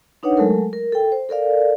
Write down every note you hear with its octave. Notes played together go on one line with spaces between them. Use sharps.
D4 D#4 B4 C#5 F#5
F#3 G#3 A3 A4 A#4
A#4
A4 G5
C5
A4 A#4 D5 F5